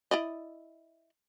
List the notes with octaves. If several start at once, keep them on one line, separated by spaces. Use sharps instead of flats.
E4 D5 D#5